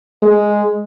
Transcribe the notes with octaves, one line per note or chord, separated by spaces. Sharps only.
G#3